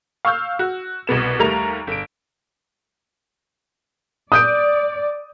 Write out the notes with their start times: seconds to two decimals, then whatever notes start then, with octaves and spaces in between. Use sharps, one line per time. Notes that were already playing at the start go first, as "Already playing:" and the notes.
0.25 F5 C#6 E6 F6 G6
0.59 F#4
1.07 C2 B2 B3 E7
1.39 D#2 G3 A3 A#4 A#5 F7
1.87 G1 D7
4.32 D5 D#6 G6 D7